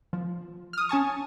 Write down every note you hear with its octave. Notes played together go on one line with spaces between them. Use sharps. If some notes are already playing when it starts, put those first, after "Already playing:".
F3
D#6 F6
C#4 G#5 A5 C#6